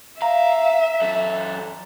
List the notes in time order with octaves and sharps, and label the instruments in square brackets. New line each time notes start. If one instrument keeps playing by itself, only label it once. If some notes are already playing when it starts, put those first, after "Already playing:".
[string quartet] E5 [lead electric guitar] F5 [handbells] A#5
[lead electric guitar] F#2 A4